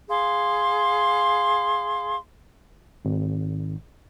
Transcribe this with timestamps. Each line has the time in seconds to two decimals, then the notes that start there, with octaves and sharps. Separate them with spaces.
0.09 G#4 F5 C6
3.05 G#1